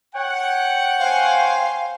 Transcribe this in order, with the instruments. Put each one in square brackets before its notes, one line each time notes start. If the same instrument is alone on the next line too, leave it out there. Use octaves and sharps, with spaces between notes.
[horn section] C#5 G5 [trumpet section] F#5
[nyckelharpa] C5 G#5 [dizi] F5